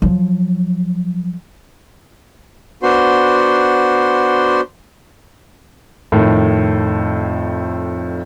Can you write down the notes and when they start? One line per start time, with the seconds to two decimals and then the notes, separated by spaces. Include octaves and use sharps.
0.02 F3 F#3
2.83 B3 D4 F#4 C5 C6
6.12 F2 A2 D#3